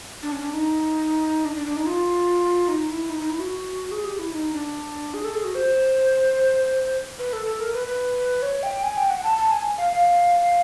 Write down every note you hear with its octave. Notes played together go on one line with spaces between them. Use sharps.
D4
C#4
D4
D#4
D4
D4
D4
D#4
F4
D#4
E4
D#4
D#4
E4
F#4
G#4
G4
E4
D#4
D4
G#4
A4
G#4
F#4
C5
B4
A4
A4
A#4
B4
B4
C#5
G5
G#5
G5
F#5
A5
A5
G#5
F5
F5